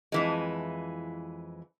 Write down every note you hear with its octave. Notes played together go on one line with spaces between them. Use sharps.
F2 E3 G#3